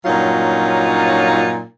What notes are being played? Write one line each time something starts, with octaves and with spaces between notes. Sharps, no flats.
G2 A#2 F#3 C#4 D#4 F4